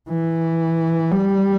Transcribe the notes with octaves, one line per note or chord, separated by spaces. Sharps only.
E3
G3